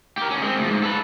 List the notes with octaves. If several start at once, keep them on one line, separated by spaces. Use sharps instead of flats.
G4 A#4
D3 C#4
G#3 C4
D2 F3
G#2
A4 B4